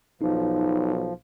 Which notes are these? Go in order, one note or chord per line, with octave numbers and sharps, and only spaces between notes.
B1 F3 D#4